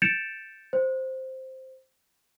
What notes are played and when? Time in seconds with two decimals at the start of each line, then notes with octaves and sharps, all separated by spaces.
0.02 G6 A6 C#7 D7 E7 F7
0.73 C5